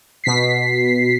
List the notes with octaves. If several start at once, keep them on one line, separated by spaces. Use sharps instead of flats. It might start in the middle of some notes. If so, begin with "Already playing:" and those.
B2 B6 C7